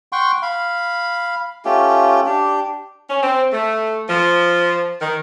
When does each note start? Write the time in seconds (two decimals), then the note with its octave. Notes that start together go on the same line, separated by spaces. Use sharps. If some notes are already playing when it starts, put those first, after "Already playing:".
0.12 F#5 G5 C6 C#6
0.42 F5 B5
1.65 A3 C#4 F4 G4
2.26 D4 G4
3.10 C#4
3.22 C4
3.52 A3
4.09 F3
5.01 D#3